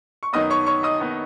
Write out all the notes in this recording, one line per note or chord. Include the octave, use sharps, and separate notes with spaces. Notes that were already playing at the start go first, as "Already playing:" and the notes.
C#6
F#2 D#3 B3 D#5 D#6
C#5 C#6
C#5 C#6
D#5 D#6
D#3 B3